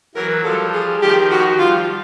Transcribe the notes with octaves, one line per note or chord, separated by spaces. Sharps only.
E3 F#3 A#4
F3 G3 A4
G#4
D#3 F3 G4
F#4
F3 G3 F4